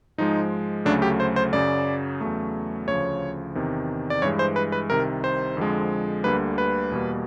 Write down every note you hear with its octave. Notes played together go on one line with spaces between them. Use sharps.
G#2 F3 G#3 D#4
D2 C#3 F#3 A3 D4
G4
C5
C5
F#2 C#3 F#3 D5
E2 C#3 F#3 A3
D2 C#3 F3 C#5
E2 C3 D#3
D5
G2 E3 G#3 C#5
C5
B4
B4
C2 C3 D#3 A#4
C5
F2 D3 F3 G#3
D2 D3 G3 A#3 B4
B4
E2 B2 G3 A#3